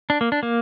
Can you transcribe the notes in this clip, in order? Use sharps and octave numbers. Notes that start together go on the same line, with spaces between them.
D4
A#3
D4
A#3